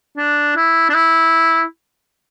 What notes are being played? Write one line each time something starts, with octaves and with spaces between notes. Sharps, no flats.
D4
E4
D4
E4